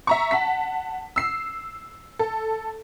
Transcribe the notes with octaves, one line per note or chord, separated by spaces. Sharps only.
E5 A#5 C#6
F#5 A5 B6
E6 C7
A4